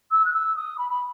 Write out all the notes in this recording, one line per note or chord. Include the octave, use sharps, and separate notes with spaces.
E6
F#6
E6
D#6
B5
B5